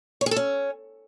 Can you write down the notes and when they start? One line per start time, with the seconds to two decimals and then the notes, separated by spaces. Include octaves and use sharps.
0.21 C#5
0.26 G#4
0.31 A4
0.36 C#4